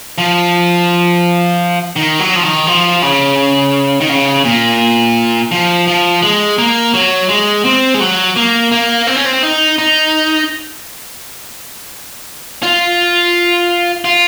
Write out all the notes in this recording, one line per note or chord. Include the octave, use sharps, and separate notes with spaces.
F3
D#3
F#3
F3
D#3
F3
C#3
D#3
C#3
A#2
F3
F3
G#3
A#3
F#3
G#3
C4
G#3
F#3
A#3
A#3
C4
C#4
C4
D#4
D#4
F4
F4